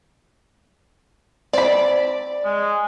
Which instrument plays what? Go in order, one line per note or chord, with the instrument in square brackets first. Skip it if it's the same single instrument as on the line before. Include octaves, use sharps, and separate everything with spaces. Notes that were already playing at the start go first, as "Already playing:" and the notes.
[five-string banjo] C4 B5 [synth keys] D5
[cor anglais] G#3